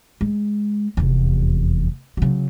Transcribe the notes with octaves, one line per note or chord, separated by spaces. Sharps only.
G#3
F1 E2
C#3 F#3